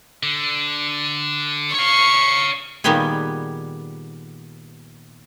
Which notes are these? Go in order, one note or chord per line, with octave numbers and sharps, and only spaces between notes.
D3
C#5 F5 C#6
A#2 D#3 G3 B3 G4 G#4